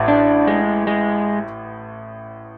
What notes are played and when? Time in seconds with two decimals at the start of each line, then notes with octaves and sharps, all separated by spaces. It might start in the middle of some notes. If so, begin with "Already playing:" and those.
Already playing: A1 A2
0.08 D4
0.47 G#3
0.87 G#3